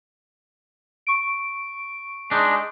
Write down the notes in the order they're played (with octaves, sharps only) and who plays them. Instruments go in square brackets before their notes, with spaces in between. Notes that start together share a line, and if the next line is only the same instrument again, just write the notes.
[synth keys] C#6 D7
[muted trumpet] G#3 [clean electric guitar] D4 D#4